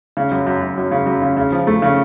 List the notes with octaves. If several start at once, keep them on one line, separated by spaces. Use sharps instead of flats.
C#3
F#2
F#2
F#2
F#2
C#3
F#2
C#3
C#3
F3
A3
C#3